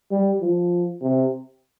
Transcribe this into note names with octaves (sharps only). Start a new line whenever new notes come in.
G3
F3
C3